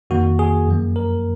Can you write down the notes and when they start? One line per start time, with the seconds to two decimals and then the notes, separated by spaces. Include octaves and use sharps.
0.10 F2 D#3 A#3 F#4
0.39 G#4
0.67 F#2 F3 A#3
0.96 A#4